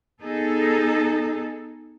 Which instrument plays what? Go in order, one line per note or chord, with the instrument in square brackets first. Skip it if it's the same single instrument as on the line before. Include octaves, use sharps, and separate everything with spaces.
[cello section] B3 D#4 G#4 A4